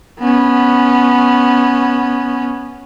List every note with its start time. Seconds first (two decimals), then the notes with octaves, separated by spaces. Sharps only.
0.20 B3 C#4